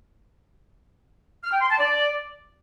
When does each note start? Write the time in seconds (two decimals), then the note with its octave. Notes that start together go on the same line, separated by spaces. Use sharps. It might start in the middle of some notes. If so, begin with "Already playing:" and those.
1.44 F6
1.53 G5
1.61 C6
1.70 A5
1.79 D5